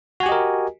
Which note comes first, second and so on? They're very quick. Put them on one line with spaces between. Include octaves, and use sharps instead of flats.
F#4 G#5 G4 D#5 A#4